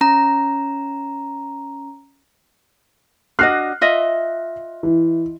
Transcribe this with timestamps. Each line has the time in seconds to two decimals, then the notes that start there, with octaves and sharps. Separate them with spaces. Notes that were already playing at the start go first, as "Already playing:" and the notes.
0.01 C#4 A#5
3.39 D4 F#4 D#5 F6 F#6 C7
3.81 F4 D#5 E5
4.83 E3